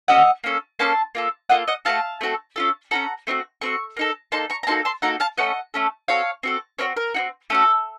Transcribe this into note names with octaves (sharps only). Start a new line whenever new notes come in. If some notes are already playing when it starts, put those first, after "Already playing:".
C#4 F#4 A4 D#5 F#5
A#3 C#4 A4
A#3 C#4 A4 A5 C6
A#3 F4 A4
A#3 F4 A4 D#5 F#5
D#5 F#5
A3 C4 F#4 A4 F5 A5
A3 C4 F#4 A4
C#4 F4 A4
C#4 F4 A4 F#5 A#5
A3 C4 D#4 F#4
A3 C4 F#4 C#6
A#3 D#4 A4
A#3 D#4 A4 A5 C6
A#5 C#6
A#5
A#3 D#4 F#4 A4 A5 C6
A5 C6
A#3 D#4 F#4 A4 F#5 A#5
F5 A5
A3 C#4 A4 D#5 F#5
A3 C#4 A4
C4 F#4 A4 C#5 F5
C4 F#4 A4
C4 D#4 F#4 A#4 C#5
A#4
C4 D#4 F#4
A3 C#4 F#4 A4